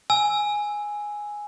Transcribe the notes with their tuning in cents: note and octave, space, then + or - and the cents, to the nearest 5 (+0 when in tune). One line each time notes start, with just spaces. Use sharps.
G#5 +0 E6 +0